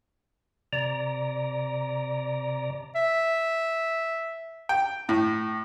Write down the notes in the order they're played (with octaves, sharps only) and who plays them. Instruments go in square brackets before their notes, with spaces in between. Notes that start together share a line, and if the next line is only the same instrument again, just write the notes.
[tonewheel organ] C3 D5 A#5
[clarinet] E5
[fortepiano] G5
A2